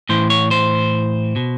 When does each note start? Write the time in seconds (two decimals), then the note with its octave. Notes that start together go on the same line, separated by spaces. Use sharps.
0.09 A2 E3 C5
0.30 C#5
0.51 C5
1.36 B2